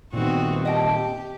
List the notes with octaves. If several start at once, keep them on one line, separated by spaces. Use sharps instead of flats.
A#2 D#3 B3 C4 F#4
G4 D#5 G5 A5